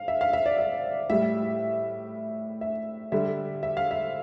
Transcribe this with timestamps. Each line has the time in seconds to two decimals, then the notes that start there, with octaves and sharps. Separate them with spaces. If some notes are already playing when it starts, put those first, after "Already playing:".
Already playing: F5
0.08 E5
0.21 F5
0.33 E5
0.46 D5
0.59 E5
1.10 A2 G3 E5
2.61 E5
3.12 D3 G3 E5
3.63 E5
3.77 F5
3.91 E5